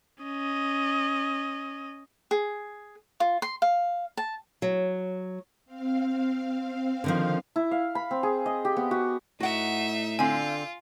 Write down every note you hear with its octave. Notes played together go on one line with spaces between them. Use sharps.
C#4 D#5
G#4
F4
C6
F5
A5
F#3
C4 F5
D3 D#3 F3
E4
F5
B5
C4
G#4
D#5
G4
B3
F#4
A2 D#4 F#4 E5 F#5
D3 C4 F4 G#5